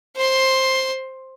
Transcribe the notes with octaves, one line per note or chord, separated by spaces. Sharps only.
C5 C6